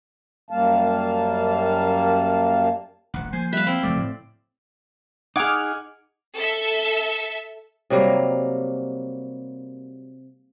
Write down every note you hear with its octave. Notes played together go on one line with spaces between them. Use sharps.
F#2 G3 A#3 F5 A5
D#1 A1 F#5
F3 A#3 C5 G#5
G3 B4 E5 F5
C4 E4 B5
F#1 F3 F#3 A3 D5
A2
D#4 G#4 F#5 D6 F6 G#6
A4 E5
C3 F#3 G3 A#3